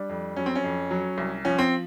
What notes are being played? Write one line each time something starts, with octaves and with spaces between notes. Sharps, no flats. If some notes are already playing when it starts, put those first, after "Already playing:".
Already playing: G3 D4
F2
F#3 C#4
C4
C#4
F2
F#3
C2
F3 C#4
C4